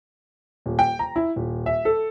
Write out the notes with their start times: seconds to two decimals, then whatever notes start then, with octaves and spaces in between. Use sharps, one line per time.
0.66 D#1
0.79 G5
0.99 A#5
1.16 E4
1.36 D#1
1.66 E5
1.85 A4